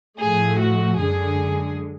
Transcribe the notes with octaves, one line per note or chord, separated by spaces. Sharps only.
A2 F3 A3 G#4
F#4
F#2 D3 G#3 G#4